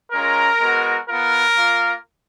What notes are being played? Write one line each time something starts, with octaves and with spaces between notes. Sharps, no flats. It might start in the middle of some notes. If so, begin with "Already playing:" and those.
G#3 C#4 F4 A#4
G#3 B3 F#4
B3 F4 A#4
A#3 F4